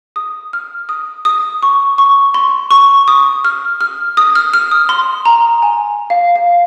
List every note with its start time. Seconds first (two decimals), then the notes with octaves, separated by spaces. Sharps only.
0.16 D#6
0.53 F6
0.89 D#6
1.25 D#6
1.63 C#6
1.98 C#6
2.34 C6
2.71 C#6
3.08 D#6
3.45 F6
3.81 F6
4.17 D#6
4.35 F6
4.54 F6
4.71 D#6
4.89 C6
5.25 A#5
5.62 G#5
6.10 F5
6.36 F5